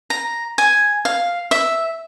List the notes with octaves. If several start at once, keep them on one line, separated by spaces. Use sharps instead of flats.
A#5
G#5
F5
E5